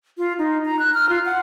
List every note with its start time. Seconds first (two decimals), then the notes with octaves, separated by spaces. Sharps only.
0.18 F4
0.38 D#4
0.65 A#5
0.79 F#6
0.94 F6
1.09 F4
1.25 F#5